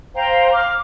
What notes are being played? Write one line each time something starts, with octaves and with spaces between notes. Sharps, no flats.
C5 F5 G5 A#5
D6 F6